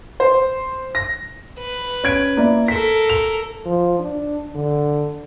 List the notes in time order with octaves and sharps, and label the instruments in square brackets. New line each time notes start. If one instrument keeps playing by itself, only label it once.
[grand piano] C5
A#6
[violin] B4
[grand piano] C#4 G#6 D7
A#3 E4 D5
[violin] A4 A#4 [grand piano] B6
[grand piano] F7
[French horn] F3
D4
D3